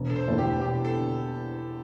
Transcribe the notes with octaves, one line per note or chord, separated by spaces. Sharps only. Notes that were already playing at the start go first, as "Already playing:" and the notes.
Already playing: E1
A4
C5
E2 D3 A3
G4
E1 G4
A4
D3